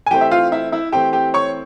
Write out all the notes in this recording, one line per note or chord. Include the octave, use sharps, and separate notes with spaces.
G#5
E3 A3 C4 G4 G5
E5
F4 F5
E4 E5
E4 E5
E3 A3 C4 G4 G5
G4 G5
C#5 C#6